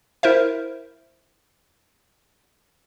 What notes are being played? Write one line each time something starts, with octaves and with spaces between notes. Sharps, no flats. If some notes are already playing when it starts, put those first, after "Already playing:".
E4 A#4 C5 E5